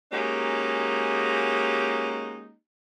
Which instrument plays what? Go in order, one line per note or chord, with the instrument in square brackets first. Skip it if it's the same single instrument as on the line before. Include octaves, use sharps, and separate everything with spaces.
[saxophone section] G#3 A#3 C#4 D#4 F#4 G4